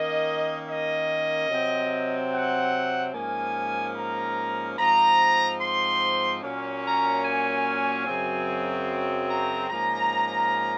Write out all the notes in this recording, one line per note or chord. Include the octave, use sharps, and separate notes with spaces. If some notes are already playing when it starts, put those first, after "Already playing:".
Already playing: D#3 A#3 C#4 D#5
D#5
C3 F#3 C4
F#5
G#2 F3 A#3 C#4 G#5
A#5
G#2 F3 C4 A#5
C6
A#2 F#3 A#3 C#4
A#5
G#5
F#2 C#3 F#3 C4
A#5
G#2 F3 A#3 C#4 A#5